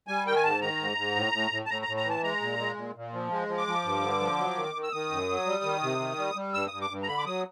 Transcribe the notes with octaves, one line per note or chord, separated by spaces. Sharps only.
G3 G#5
D#3 G5
G#5
G#2 A5
D#3 A#5
G#2
G#2
A2
A2
A2
A5
A2 A#5
A#5
A2
A#5
E3 A5
G#3 A#5
A#2
G#3
A#2
A#2
F3
G#3
F3
D6
F3
G2
D3
F3
F#3
D#3
D#3
E6
D#3 D#6
F#2
F#3
G3
D#3
C3
D#3
G3
G3
G2 E6
G2 D#6
D6
G2
A#5
D3 B5
D6
F#3 D#6